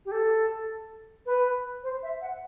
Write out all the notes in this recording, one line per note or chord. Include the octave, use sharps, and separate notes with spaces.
G4
A4
B4
C5
E5
F#5